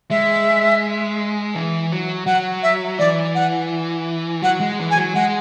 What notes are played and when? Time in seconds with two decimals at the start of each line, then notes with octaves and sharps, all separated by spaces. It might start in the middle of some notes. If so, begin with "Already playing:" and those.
0.10 G#3 E5
1.55 E3
1.91 F#3
2.26 F#3 F#5
2.63 E5
2.99 E3 D5
3.35 F#5
4.42 F#3 F#5
4.61 G#3
4.79 E3
4.91 G#5
4.96 F#3
5.15 G#3 F#5